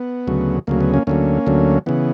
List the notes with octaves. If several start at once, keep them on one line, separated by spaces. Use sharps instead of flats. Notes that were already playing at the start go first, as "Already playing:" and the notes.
Already playing: B3
D2 C#3 F#3
D2 C#3 F#3 A#3
B3
A#3 C#4
D2 D3 F#3 A#3 C#4
D2 D3 F#3
C#3 E3 B3